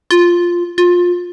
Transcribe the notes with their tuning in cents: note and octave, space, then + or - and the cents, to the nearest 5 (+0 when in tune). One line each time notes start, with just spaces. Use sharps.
F4 +0
F4 +20